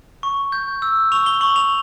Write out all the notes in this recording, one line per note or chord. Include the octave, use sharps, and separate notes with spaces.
C#6
G6
E6
C#6 F7
G7
C#6 F#7
F7